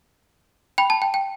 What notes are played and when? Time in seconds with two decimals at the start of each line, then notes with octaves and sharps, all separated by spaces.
0.78 G5 B5
0.90 A5
1.02 G5
1.14 G5